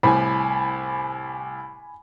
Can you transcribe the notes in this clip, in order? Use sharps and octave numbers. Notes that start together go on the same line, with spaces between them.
C2 A2 G#5 B5